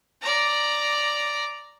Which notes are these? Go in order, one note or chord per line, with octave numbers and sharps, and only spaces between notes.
D5 A#5